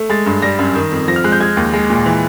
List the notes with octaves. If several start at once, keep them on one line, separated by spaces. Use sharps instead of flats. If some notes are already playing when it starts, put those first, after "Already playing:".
Already playing: A3
G#3 A6
G2
G3 A#6
F#2
D#3
F2
F3 A#6
F6
G#3 F#6
G6
G#3 G#6
D#2
G#3
A#2
E3